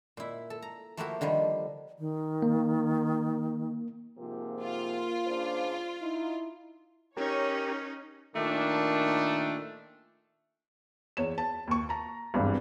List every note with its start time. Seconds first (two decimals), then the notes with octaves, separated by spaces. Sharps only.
0.17 A#2 E4
0.50 A4
0.62 A#5
0.97 F3 A3 A#3 E4 F#4 G4
1.21 D3 D#3 F3 G3
1.99 D#3
2.42 A#3
4.18 G#2 C3 F3 A#3
4.61 F4
5.26 C#3 D4 C5
6.02 D#4 E4
7.17 C#4 D#4 G4 A#4 C#5
8.36 A#2 D#3 A3 D4
11.17 E2 C#5 E7
11.38 A5
11.67 D#2 C#6
11.89 A5 A#5
12.34 G#1 E2 G2